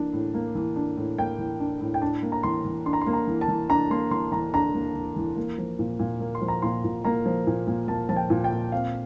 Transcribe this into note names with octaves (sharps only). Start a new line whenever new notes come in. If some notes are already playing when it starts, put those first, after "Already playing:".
Already playing: E3 A#3 D4
A2
A#3
E3
D4
A2
A#3 G5
E3
D4
A2
G5
D4 A5
A#3
A#5
E3 C6
E3
D4 C6
A#5
C6
A#3
A#5
E3
A5
E3
D4 A#5
A#3 C6
E3 C6
E3 A#5
D4 A#5
A#3
E3
E3
A#3
F3
A#2
A#2
A#3
C6
F3
A#5
A#2 C6
A#2
A#3 A#5
F3
A#2
A#2
A#3 A5
F3 A5
G5
A#2
G5
A#2
C4 F5